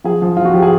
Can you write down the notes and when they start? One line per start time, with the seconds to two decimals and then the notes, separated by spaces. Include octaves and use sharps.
0.04 F3 G#4
0.22 F3
0.37 F3 F4
0.45 F#4
0.54 F3 G4
0.62 G#4